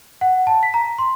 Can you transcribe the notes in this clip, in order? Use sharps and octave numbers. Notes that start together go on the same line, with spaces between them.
F#5
A5
B6
A#5
C6